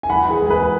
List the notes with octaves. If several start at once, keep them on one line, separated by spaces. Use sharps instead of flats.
G#5
E3 F#5 B5
E3
G#4
G#3
G#4
B4
G#3